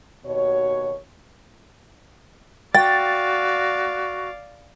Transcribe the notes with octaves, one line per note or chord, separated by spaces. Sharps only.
D#2 B2 F#4 C#5
F#4 D5 F5 G5 A6